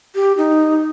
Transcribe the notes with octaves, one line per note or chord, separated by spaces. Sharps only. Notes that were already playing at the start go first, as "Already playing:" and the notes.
G4
D#4